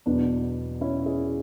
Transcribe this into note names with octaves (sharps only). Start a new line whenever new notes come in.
E2 B2 F#3 B3 D4
C#4 E4
E4 G#4